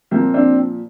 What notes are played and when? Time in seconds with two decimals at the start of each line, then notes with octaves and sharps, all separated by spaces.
0.11 A#2 F3 A#3 C4
0.34 C4 D4